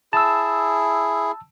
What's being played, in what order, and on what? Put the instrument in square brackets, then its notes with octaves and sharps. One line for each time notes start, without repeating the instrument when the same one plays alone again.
[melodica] E4 G#4 [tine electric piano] A5 E6